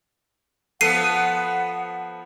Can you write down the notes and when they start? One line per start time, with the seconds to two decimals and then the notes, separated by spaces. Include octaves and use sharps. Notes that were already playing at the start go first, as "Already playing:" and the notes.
0.81 F3 B3 A4 F#5 C7 D#7